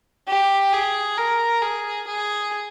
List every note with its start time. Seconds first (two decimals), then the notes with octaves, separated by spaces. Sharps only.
0.28 G4
0.73 G#4
1.17 A#4
1.62 G#4
2.07 G#4